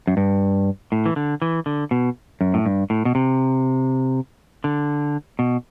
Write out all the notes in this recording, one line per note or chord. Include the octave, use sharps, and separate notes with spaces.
F#2
G2
A2
E3
D3
E3
D3
B2
F#2
A2
G2
A2
B2
C3
D3
B2